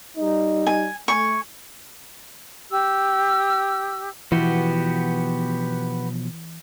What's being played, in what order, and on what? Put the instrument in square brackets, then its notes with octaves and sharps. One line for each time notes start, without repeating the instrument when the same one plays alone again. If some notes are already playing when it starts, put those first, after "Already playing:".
[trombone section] G3 D#4
[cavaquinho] G#5
[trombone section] A3 [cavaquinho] G#5 C#6
[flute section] G4 E6
[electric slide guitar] B2 F3 [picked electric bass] E3 [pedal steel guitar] B3 F#4 G4